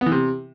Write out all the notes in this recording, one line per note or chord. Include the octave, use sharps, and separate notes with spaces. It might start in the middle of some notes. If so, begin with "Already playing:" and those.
B3
E3
C3